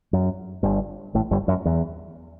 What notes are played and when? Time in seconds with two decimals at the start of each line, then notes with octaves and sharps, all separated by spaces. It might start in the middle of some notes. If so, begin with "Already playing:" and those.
0.13 F#2
0.63 G1 G2
1.14 A1 A2
1.31 G1 G2
1.48 F#2
1.65 E2